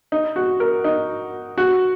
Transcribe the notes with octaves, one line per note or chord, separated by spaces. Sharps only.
D#4
F#4
A#4
D#4
F#4